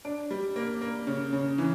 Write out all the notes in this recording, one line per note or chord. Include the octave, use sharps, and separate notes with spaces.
D4
G3
A#3
A#3
C#3
C#3
E3